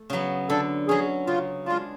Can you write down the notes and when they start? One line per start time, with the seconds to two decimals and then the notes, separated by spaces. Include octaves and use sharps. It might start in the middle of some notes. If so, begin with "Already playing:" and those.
Already playing: A3
0.10 C#3 F#3 B3
0.49 D3 A4
0.88 F#3 C#4 G#4
1.27 C#3 F4
1.66 G#3 D4 F4